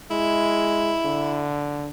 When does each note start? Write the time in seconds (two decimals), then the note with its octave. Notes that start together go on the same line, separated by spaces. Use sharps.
0.11 G#3 E4
1.05 D3